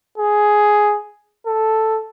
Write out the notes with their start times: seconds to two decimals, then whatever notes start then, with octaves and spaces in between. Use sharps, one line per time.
0.17 G#4
1.47 A4